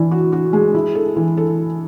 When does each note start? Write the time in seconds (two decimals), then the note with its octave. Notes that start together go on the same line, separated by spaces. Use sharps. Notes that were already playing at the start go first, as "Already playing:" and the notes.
Already playing: E3 D4
0.11 F#4
0.32 F#4
0.53 G#3
0.75 E4
0.95 A4
1.16 E3
1.37 A4